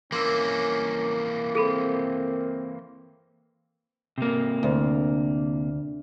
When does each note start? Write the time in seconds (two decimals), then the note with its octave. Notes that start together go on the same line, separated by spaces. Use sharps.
0.12 E3 A#3 C#4 A#4 C6 D6 E6
1.55 C4 G#4 A4 B5
4.18 C3 A#3
4.63 D2